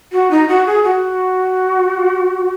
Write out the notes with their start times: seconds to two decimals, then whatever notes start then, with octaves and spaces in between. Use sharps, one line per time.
0.12 F#4
0.31 D#4
0.48 F#4
0.66 G#4
0.84 F#4